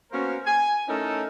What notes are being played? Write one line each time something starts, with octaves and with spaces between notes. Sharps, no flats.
A#3 B3 C#4 F#4 A#4 C5
G#5
A3 C#4 D#4 E4 A4 A#4